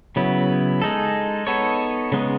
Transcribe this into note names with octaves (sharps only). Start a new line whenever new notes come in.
C#3 F#3 B3 E4
G#3 D#4 A4
B3 D#4 A4 C#5
C#3 G#3 B3 D#4